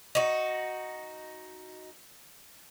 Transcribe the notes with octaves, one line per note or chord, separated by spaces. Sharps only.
D#4 F#4